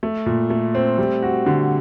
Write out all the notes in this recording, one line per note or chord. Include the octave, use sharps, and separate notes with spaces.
A3
A#2
A3
C4
G3
F#4
D3